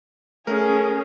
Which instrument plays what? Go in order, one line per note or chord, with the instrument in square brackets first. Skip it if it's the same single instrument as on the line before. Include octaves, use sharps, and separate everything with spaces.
[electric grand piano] A3 A#4 [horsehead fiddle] C#4 G#4